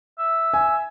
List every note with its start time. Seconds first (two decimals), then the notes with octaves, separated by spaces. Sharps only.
0.19 E5
0.53 G#5